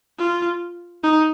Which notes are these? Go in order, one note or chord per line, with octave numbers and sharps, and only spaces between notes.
F4
D#4